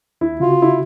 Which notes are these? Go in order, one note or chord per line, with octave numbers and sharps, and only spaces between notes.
D#2 E4
C#3 F4 F#4
E4